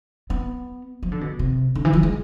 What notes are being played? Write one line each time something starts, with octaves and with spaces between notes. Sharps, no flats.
B3
F3
D3
B2
C3
D3
E3
F3
G#3